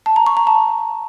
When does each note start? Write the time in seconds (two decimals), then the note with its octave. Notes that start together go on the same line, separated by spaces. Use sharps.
0.06 A5
0.16 A#5
0.26 C#6
0.37 A#5
0.47 A5